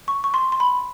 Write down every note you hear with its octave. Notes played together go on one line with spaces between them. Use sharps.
C#6
C#6
C6
C6
B5